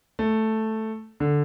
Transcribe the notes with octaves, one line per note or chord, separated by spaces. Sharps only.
A3
D3